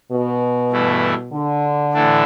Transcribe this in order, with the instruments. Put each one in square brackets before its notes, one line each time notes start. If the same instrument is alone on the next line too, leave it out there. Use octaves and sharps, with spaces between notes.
[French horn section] B2
[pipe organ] G2 E3 A3 E4
[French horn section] D3
[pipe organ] A2 E3 A3 D4